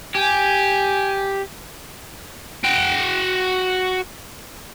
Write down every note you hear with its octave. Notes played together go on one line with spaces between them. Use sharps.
G4 G#5
F#4 G5